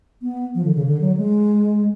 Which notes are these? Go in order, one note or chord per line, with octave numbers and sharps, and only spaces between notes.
B3
F3
D3
C#3
D3
F#3
G#3